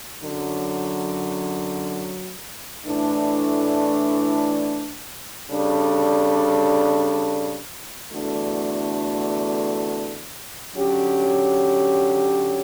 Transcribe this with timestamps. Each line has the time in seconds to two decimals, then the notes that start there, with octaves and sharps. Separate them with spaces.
0.21 F#2 D3 F#3
2.85 A2 E3 A3 D4
5.48 C#3 G3 D4 A4
8.12 E2 D3 A3 D4 F#4
10.76 D3 F#3 C#4 G4